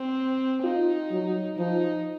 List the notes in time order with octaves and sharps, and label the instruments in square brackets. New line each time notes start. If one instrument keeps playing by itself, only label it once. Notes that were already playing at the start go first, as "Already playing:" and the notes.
Already playing: [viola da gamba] C4
[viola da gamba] D#4 [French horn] F4
[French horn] F#3
[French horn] F3 [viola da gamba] D#4